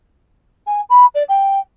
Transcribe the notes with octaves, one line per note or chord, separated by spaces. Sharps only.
G#5
B5
D5
G5